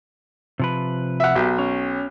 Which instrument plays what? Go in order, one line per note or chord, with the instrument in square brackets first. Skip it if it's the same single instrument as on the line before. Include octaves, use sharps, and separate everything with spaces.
[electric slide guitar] C3 F3 B4
[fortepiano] E5 F#5
[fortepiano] B1 [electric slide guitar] G4
[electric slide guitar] C#4